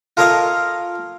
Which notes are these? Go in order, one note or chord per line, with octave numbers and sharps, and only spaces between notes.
F4 A4 A#4 C#5 D#5 F5